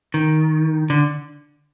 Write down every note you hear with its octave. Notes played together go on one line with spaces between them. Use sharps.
D#3
D3